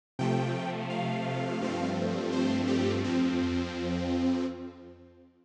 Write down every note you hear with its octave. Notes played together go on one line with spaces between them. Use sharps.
C3 F3 A3 G5
F5
G2 F3 A3 C4
C5
G4
F2 F3 C4